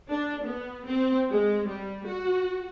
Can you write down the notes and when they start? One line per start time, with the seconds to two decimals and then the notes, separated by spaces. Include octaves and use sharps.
0.11 D4
0.45 B3
0.86 C4
1.29 G#3
1.67 G3
2.05 F#4